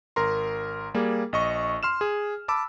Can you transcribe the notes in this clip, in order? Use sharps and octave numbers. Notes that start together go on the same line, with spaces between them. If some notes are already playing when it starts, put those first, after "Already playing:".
G#1 A#4 A#5 C6
G3 A#3 G#4
A#1 D#5 C#6
C6 F6 E7
G#4
A5 B5 D6 E6